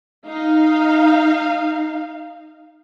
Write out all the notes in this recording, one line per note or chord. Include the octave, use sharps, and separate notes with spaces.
D#4 F5